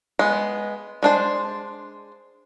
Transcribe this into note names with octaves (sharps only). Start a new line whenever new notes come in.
G#3 B3
G#3 D4 C5